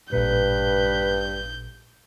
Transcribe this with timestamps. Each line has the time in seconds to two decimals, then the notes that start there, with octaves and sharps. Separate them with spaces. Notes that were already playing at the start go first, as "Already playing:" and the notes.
0.12 A1 G2 A#2 B4 G6